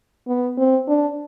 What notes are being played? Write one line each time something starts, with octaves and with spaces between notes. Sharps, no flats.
B3
C4
D4